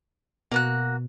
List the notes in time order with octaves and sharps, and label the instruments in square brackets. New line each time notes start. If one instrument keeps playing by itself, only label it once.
[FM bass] B2 [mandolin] A#3 F#4 F#6